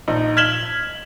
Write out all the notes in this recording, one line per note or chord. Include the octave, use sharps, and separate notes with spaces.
A#1 D#4
F6 G#6 B6 E7 F#7 G7